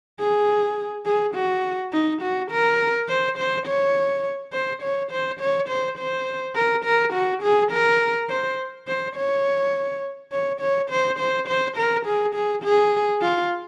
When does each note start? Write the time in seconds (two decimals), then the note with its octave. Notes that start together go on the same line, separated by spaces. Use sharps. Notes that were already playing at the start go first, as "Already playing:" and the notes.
0.20 G#4
1.05 G#4
1.35 F#4
1.93 D#4
2.22 F#4
2.51 A#4
3.08 C5
3.38 C5
3.67 C#5
4.53 C5
4.82 C#5
5.11 C5
5.40 C#5
5.69 C5
5.98 C5
6.55 A#4
6.85 A#4
7.13 F#4
7.43 G#4
7.72 A#4
8.29 C5
8.88 C5
9.16 C#5
10.32 C#5
10.61 C#5
10.90 C5
11.19 C5
11.48 C5
11.77 A#4
12.06 G#4
12.35 G#4
12.63 G#4
13.22 F4